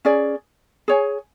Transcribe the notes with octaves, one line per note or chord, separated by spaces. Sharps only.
C#4 G#4 D5
G#4 C#5 G#5